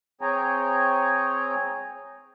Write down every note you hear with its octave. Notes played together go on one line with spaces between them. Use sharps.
C4 G#4 C#5 G5 G#5 A#5